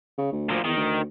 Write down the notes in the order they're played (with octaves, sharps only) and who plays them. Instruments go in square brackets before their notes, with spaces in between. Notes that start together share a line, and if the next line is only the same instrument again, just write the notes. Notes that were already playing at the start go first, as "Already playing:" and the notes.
[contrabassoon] C#3
D2
[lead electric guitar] A#2 F3
[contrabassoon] E2 [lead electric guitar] D#3
[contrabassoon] D2